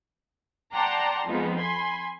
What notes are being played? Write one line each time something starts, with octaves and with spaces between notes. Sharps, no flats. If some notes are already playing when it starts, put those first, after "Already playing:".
D5 F#5 G5 A5 A#5 C6
F2 F3 G#3 B3 D#4
G#5 B5 C6 G#6